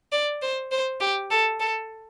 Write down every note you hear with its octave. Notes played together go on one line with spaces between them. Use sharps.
D5
C5
C5
G4
A4
A4